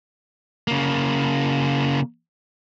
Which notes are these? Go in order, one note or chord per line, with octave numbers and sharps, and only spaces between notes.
C#3 A#3